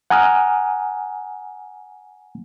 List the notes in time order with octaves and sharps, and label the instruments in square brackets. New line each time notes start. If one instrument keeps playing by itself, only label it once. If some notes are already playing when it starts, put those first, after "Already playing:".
[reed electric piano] F#5 G#5 A#5 D#6 F6